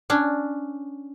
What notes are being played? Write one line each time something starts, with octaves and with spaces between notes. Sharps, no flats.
C#4 D4